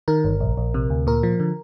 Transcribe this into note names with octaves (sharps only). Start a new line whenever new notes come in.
D#3 A#4
G1
A#1
A#1
C3
D2
A#2 A#4
F3
D3